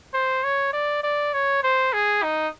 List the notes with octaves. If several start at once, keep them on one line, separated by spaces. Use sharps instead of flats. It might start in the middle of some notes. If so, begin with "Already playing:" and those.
C5
C#5
D5
D5
C#5
C5
G#4
D#4